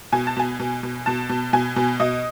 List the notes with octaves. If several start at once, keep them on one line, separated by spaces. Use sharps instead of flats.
B2 G#5
A5
B2 G#5
B2
B2
B2 A5
B2
B2 G#5
B2
B2 D#5